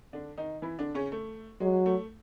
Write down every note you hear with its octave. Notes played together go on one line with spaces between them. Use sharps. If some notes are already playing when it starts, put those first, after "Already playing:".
D3 D4
D#3 D#4
E3 E4
D3 D4
C#3 C#4
A3
F#3 G#3
A3